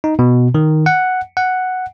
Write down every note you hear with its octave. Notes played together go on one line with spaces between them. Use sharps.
D#4
B2
D#3
F#5
F#5